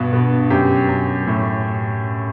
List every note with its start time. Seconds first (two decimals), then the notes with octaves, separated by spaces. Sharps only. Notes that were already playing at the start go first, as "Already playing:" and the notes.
Already playing: G2 B2
0.13 B2
0.50 F#2 G4
0.89 F#2
1.27 A2